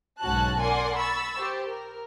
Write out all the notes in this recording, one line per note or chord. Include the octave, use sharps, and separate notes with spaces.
B1 G#2 C#4 F#4 A5 F#6
A#4 D5 F#5 G#5 C6
B5 C#6 E6 A6
G4 C5
A#4